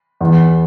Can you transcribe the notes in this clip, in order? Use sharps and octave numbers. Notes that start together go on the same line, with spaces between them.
E2